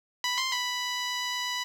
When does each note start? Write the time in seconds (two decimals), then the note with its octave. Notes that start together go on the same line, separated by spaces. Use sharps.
0.24 B5
0.38 C6
0.51 B5